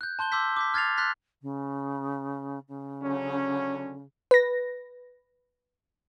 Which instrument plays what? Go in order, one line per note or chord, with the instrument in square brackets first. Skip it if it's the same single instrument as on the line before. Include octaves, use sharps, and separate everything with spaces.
[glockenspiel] F#6 G6
A5 C6 G6 G7
C6 D6 E6 G6 B6
D6 G6 B6
F6 G#6 A6 C7 F7
C6 F6 F#6 G#6 A6 B6
[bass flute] C#3
C#3
[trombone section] D3 F#3 C#4
[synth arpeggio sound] B4 A#6